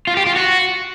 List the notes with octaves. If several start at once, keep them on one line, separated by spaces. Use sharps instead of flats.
F4
G4
F4
F#4